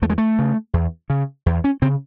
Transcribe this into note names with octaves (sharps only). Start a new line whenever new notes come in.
E2 A3
G#3
A3
C#3
E2
C#3
E2
C#4
C#3 C4